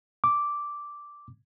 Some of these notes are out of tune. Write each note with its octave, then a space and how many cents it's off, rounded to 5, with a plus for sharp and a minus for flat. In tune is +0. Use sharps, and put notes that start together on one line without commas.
D6 -5